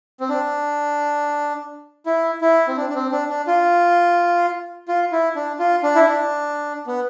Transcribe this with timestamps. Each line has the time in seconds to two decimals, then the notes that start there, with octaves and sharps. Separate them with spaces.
0.20 C4
0.29 D4
2.06 E4
2.41 E4
2.68 C4
2.77 D4
2.89 D4
2.95 C4
3.12 D4
3.29 D4
3.47 F4
4.88 F4
5.12 E4
5.36 D4
5.59 F4
5.83 D4
5.95 E4
6.07 D4
6.87 B3